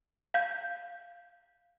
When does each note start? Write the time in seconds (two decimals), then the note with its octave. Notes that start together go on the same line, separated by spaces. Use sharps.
0.34 F5 G6